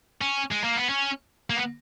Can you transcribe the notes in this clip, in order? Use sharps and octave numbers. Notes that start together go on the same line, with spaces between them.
C#4
G#3
A#3
B3
C#4
A#3
B3